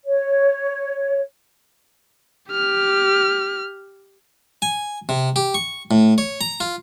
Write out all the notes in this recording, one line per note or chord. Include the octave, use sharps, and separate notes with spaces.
C#5
G4 F6
G#5
C3
G4
C#6
A2
C#5
A#5
F4